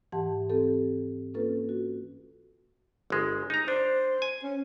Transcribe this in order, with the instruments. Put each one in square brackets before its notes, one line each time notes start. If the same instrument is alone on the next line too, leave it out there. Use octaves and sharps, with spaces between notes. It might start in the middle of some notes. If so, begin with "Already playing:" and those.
[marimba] G#2 E3 G4 F#5 A5
C4 G4 A4
A#3 C#4 F4 A4 B4
F#4
[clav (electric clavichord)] G1 G#3
D#4 A#5
[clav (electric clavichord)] D4 [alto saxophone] C5
[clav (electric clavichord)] G#5
[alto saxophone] C#4